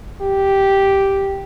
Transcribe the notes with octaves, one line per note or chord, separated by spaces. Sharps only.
G4